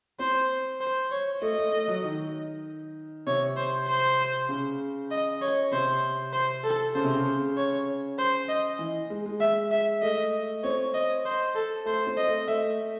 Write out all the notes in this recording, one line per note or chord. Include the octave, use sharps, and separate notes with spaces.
C4 C5
C5
C#5
A3 D#5
A3
A3
F#3
D#3
C3 C#5
C5
C5
C#3
D#5
C#5
C3 C5
C5
A4
C#3 C5
C3
C#3
C#5
C5
D#5
E3
G#3
G#3
E5
E5
A3 D#5
C4 C#5
D#5
C5
A4
A3 C5
C4
D#5
A3
A3 E5